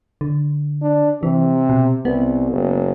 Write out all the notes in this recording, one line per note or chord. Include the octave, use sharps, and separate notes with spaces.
D3
D4
C3 E3
B2
C2 B3
F#1